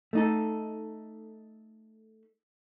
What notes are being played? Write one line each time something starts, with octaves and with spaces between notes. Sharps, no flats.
A3 D#4 A4